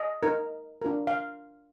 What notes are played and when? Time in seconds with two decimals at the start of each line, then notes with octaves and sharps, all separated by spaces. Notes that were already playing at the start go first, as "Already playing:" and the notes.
Already playing: D#5
0.23 D#4 A#4
0.82 D4 F4 A#4
1.07 F5